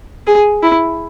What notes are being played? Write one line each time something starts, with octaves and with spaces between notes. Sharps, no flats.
G#4
E4